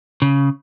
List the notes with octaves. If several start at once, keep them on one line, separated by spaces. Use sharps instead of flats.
C#3